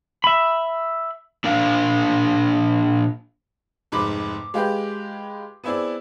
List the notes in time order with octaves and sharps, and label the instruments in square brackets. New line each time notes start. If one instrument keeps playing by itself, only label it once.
[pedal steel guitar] E5 B5
[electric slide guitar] A#2 D4 A#4 F5
[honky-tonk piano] F1 G#2 B5 D6
G#3 F4 G4 G#4 B4 G5
B3 C4 E4 G#4 D5